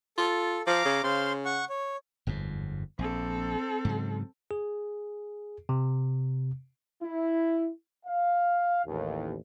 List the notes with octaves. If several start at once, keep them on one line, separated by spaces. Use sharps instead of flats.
F4 A4
F3 F5 A#5 D6
C#3
C#3 C5 F5 C6
F#5 C#6
C#5
G1 F2 G#2
A#1 C4 A4
G#2 C#3 F#3
G#4
C3
E4
F5
A1 D#2